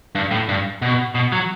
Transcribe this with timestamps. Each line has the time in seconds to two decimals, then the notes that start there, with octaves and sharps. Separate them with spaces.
0.15 G2
0.31 A2
0.49 G2
0.82 B2
1.15 B2
1.32 F#3